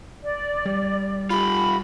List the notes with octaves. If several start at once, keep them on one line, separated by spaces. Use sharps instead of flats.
D5
G3
F4 G4 B5